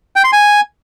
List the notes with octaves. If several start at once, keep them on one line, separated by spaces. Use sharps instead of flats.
G5
C6
G#5